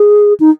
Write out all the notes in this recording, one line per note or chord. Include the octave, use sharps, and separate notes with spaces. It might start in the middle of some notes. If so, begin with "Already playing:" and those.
Already playing: G#4
D#4